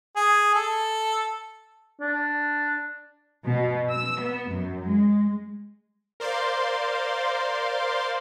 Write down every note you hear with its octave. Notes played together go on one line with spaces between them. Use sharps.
G#4
A4
D4
B2
E6
B3
F#2
G#3
A#4 C5 D5 F5 C6